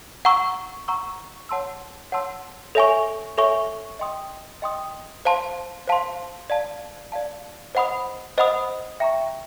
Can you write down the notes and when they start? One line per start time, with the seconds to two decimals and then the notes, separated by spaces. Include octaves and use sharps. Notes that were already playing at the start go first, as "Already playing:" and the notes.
0.25 F#5 A#5 C#6 E6
0.88 F#5 A#5 C#6 E6
1.49 C#5 F#5 A5 C6 E6
2.12 C#5 F#5 A5 C6 E6
2.75 A4 C#5 E5 G#5 C#6
3.38 A4 C#5 E5 G#5 C#6
3.99 D#5 G5 C6 D#6
4.62 D#5 G5 C6 D#6
5.25 C5 F5 A5 C6
5.87 C5 F5 A5 C6
6.50 D5 F5 A5
7.12 D5 F5 A5
7.75 C5 D#5 F#5 B5 D#6
8.38 C5 D#5 F#5 B5 D#6
9.00 E5 G5 A#5 C#6